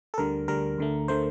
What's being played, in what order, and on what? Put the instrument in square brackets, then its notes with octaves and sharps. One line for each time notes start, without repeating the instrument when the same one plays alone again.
[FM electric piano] A4
D2 D3 G3 A#4
D2 D3 G3 A#4
D2 D3 A3
D3 A3 C5